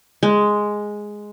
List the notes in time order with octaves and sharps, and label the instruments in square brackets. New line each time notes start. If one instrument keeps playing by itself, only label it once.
[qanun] G#3